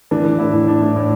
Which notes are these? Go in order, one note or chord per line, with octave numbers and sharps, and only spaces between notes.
E3 D4
E3
A2 E4
E3
A2 D4
A2
A2